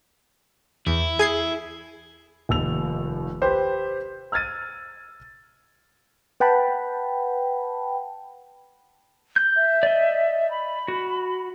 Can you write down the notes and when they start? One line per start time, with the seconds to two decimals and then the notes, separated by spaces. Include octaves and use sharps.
0.86 E2 E4
1.19 G#4 G#6 C7
2.49 F1 D#2 E6 F7
3.42 G4 B4 C5
4.32 E6 F6 G#6 A6 D#7
6.40 B4 F#5 G5 A5 B5
9.36 G6
9.56 E5
9.83 D5 D#5
10.51 B5
10.88 F#4